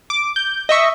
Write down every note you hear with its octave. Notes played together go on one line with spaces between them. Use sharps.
D6
G6
D#5 E5 C#6